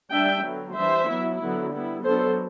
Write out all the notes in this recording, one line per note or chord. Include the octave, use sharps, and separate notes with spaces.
G3 D4 E5 G5
D3 F#3 B3
E3 G3 D4 C5 E5
F#3 B3 E4
D3 F#3 B3 E4
G3 B3 E4
F#3 B3 D4 A4 C5